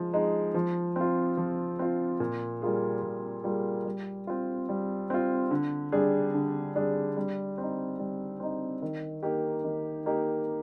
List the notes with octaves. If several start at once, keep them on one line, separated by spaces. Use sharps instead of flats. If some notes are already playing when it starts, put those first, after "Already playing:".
Already playing: F3 G#3
G#3 D#4
F3
C4 F4
F3
C4 F4
A#2
G3 A#3 F4 G#4
A#2
G3 A#3 F4 G#4
G3
C4 F4
G3
C4 F4
D3
G3 D4 G#4
D3
G3 D4 G#4
G3
C4 D#4
G3
C4 D#4
D#3
A#3 D#4 G4
D#3
A#3 D#4 G4